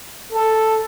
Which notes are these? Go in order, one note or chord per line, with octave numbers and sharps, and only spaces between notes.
A4